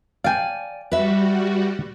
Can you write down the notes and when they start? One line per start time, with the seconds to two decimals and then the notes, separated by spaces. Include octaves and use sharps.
0.24 D5 F5 G5 G#5
0.92 G3 F#4 B4 E5